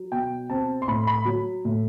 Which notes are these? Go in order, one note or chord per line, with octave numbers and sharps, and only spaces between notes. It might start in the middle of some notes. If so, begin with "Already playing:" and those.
Already playing: F#3
B2 G5
C4 A5
C6
A2 B5
B5
F#3
A2